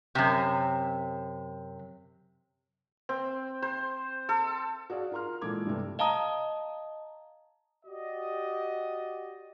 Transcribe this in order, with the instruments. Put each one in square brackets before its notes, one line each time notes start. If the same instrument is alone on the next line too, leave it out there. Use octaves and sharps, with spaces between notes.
[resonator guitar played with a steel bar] F#2 C3
[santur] C4
C5
A4
[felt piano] F#4 G#4 D5 F5
F4 A#4 A#5 C6 F6
A#2 E3 G#3 A4 D6 G#6
G2 C3 A3
[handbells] D#5 F5 A5 A#5 D#6
[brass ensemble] F#4 G4 D5 D#5